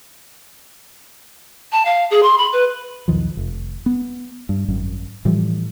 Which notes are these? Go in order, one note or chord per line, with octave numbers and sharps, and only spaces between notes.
A5
F5
G#4
C6
B5
B4
B1 E2 D#3 F3
F1
B3
G2
G#1 F#2
A2 E3 F3 G3